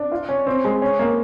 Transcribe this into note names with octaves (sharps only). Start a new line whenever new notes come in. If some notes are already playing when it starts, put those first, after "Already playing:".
Already playing: D4
F4
C#4
C4
G#3
C#4
A#3